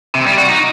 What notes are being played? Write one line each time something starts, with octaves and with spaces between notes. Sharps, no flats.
C3
G3
F#4
D#4